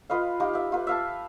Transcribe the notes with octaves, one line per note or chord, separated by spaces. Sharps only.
F4 B4 D#5 F5
D#4 F4 G4
G4 E5
F4 B4
E5 F5 A5